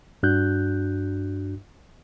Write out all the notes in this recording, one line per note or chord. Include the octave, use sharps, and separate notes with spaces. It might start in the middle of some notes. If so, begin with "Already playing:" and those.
G2 D4 F#4 F#6 G6